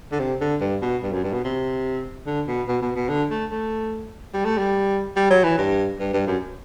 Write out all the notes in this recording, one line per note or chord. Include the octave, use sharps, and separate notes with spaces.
D3
C3
D3
G2
B2
G2
F#2
G2
B2
C3
D3
B2
B2
B2
B2
D3
A3
A3
G3
A3
G3
G3
F#3
E3
G2
G2
G2
F#2